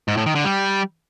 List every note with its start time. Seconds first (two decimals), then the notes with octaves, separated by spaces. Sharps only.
0.08 G#2
0.17 A2
0.26 D#3
0.35 D3
0.44 G3